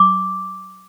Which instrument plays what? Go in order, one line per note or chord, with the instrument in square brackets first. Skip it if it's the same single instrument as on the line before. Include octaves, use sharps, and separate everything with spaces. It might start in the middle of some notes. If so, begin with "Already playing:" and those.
Already playing: [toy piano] D6